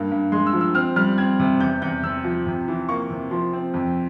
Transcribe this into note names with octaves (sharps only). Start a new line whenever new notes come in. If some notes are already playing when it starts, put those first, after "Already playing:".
Already playing: G2 A#3
G2
G#3 C6
E6
F3
E6
C4 F6
G3 F6
C4 G#6
C3
E2 G6
E2 G6
C3 E6
F3
C3
E3
A#3 C#6
C3
F3 C6
C4
F2